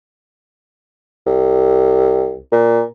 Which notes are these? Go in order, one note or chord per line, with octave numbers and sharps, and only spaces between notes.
C2
A#2